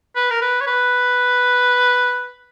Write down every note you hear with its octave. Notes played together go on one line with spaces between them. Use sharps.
B4
A#4
B4
C#5
B4